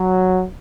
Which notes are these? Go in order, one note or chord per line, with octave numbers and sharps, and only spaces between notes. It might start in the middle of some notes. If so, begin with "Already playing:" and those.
Already playing: F#3